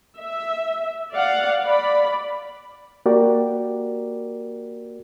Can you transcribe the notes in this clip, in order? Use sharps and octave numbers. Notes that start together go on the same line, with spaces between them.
E5
D5 F5 F#5
D5 B5
A#3 F#4 G4 A#4 D5